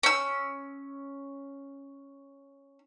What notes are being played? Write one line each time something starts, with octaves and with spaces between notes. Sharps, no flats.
C#4 E6